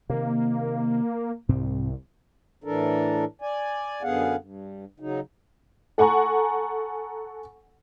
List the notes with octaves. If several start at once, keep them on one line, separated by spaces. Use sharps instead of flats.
C3 D#3 A#3
C2 G#2 C3 C4
A2 E3 D4 A4 A#4
D5 G#5
F#2 D3 B3 G#4 F5 F#5
G2
C#3 F#3 D#4
A4 F#5 G#5 A#5 C#6